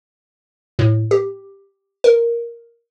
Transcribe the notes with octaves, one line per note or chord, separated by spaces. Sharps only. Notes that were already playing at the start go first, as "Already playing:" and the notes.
A2
G4
A#4